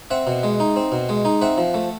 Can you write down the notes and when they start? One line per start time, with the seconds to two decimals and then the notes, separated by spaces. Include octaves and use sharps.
0.10 C4 E5 F#5
0.27 B2
0.43 G#3
0.60 D#4
0.76 C4
0.92 B2
1.09 G#3
1.25 D#4
1.41 C4 E5 F#5
1.58 F3
1.74 A3